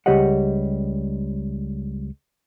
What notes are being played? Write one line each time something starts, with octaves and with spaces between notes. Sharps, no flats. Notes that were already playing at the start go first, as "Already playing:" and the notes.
C#2 G3 G4 C#5 D#5 F#5